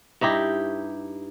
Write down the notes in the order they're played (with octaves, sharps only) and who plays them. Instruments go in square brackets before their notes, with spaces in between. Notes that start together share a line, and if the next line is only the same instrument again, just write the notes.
[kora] G2 D#4 E4 G4